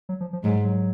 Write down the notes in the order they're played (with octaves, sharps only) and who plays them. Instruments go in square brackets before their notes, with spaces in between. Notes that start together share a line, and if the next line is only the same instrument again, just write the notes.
[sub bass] F#3
F3
F3
[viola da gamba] G#2 [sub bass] F#3
[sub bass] F#3